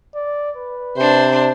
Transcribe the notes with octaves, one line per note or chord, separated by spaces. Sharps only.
D5
B4
C3 D4 C5